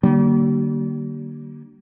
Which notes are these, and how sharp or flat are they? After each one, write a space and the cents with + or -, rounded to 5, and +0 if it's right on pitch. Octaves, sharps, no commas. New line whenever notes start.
D3 +20 G3 -45 A#3 +0